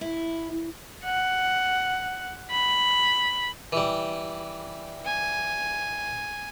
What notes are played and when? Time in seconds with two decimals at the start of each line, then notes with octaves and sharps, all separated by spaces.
0.01 E4
1.05 F#5
2.51 B5
3.73 E3 G3
5.05 G#5